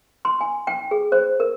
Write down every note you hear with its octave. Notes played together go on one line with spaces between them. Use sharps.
C6
G#5
G5
G#4
C5
A#4